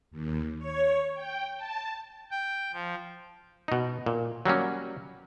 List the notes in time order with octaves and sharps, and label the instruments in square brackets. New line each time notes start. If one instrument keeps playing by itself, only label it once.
[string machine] D#2
C#5
G5
A5
[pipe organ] G5
F3
[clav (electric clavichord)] B2 D#4
A#2
F#3 G3 A#3 C#4